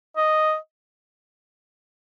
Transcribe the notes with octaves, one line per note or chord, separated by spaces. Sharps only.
D#5